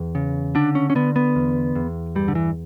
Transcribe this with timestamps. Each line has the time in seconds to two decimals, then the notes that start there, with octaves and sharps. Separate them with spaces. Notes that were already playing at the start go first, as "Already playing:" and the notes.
Already playing: E2
0.15 C#3
0.55 D3 D4
0.75 C#4
0.90 C#4
0.95 D3 B3
1.16 B3
1.36 E2
1.76 E2
2.15 G2 G3
2.28 D3
2.35 E3